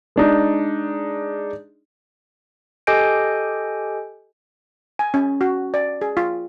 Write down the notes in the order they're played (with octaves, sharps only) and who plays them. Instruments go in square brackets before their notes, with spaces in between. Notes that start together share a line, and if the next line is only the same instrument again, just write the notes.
[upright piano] G#3 D4 D#4
[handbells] G4 A4 D#5 G#5 G6 D7
[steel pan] G#5
C#4
F#4
D5
G#4
F4